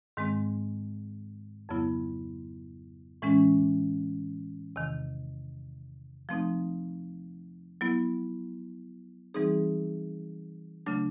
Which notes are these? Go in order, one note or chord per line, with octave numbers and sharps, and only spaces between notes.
G#2 D#3 G#3 C4
F2 C#3 F#3 B3 E4
A2 E3 G#3 C#4
E2 C3 D#3
F3 A3 C4 D#4
F#3 B3 E4
E3 G3 C4 D#4 G#4
C#3 F#3 A3 D4